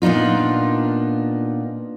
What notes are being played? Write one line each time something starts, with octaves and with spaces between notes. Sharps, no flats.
A#2 B3 D4 D#4 F4